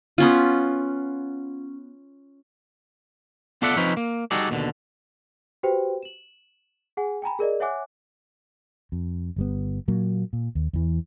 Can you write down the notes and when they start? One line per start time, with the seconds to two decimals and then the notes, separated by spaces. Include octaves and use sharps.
0.18 B3 C#4 F4
3.62 B3 F4 A4 D5 E5 F#5
3.76 F3 C4 C#4 D#4 B4
3.97 A#3
4.31 G3 D#4 F#4 G#4 A4 D5
4.50 D#2 B2 D3
5.63 F#4 G4 B4 C5 G5
6.03 E7 F#7
6.97 G#4 F#5 G#5
7.22 G5 G#5 A#5 B5
7.39 G#4 A#4 D5 D#5
7.60 C#5 E5 F#5 G#5 D6 F#6
8.92 F2
9.36 G1 G3 B3
9.88 A#2 F#3 A#3
10.33 A#2
10.55 D#2
10.73 E2 E3